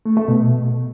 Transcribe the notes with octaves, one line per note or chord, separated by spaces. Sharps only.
A3
A3
B2